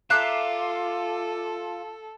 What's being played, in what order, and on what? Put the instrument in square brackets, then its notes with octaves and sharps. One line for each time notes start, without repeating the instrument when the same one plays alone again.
[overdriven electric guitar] F4 [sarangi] A4 [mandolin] E5 A#5 F#6 [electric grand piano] D6 C7 E7